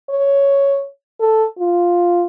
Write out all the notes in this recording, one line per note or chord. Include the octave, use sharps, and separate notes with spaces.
C#5
A4
F4